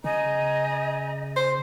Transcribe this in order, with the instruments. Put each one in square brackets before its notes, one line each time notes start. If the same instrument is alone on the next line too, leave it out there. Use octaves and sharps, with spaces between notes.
[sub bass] C#3 [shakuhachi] D#5 [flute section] G#5 A#5 G6
[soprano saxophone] C5